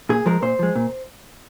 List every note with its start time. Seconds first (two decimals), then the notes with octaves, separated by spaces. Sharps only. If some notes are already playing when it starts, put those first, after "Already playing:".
0.09 A#2 G#4
0.26 F3 G#3 A#4
0.42 A#2 C5
0.59 F3 G#3
0.75 A#2